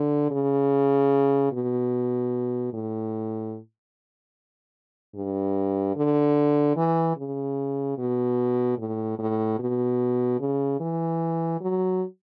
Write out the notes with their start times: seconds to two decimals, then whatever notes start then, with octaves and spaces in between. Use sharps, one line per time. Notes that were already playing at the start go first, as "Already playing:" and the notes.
Already playing: D3
0.31 C#3
1.52 B2
2.73 A2
5.15 G2
5.96 D3
6.77 E3
7.17 C#3
7.98 B2
8.78 A2
9.19 A2
9.59 B2
10.40 C#3
10.80 E3
11.61 F#3